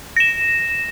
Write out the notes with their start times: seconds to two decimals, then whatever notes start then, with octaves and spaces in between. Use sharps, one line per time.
0.16 A#6 E7